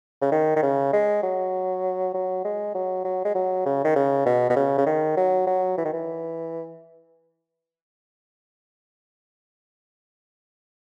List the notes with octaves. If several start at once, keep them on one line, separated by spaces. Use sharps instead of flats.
C#3
D#3
D#3
C#3
G#3
F#3
F#3
G#3
F#3
F#3
G#3
F#3
C#3
D#3
C#3
B2
B2
C#3
C#3
D#3
F#3
F#3
E3
D#3
E3